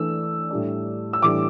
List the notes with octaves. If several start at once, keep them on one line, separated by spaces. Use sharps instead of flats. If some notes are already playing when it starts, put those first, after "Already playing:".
Already playing: E3 A3 D4 E6
A2 G3 D4
E6
A2 E3 G3 D4 D6